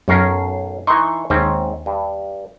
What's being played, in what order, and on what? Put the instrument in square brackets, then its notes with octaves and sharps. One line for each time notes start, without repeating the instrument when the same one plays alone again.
[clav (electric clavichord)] B1 C#4 A#4 [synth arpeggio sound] F#2 C7
[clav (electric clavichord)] E3 D#4 [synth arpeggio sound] C6 C#6
[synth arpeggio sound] D#2 [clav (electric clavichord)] G#2 C4 C#4
[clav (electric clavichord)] G2